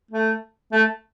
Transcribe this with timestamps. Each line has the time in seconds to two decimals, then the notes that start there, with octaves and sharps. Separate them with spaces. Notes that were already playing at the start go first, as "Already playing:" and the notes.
0.11 A3
0.72 A3